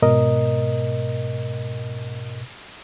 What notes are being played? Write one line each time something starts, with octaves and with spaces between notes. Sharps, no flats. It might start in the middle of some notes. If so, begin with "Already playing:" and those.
G#2 B2 A#4 D#5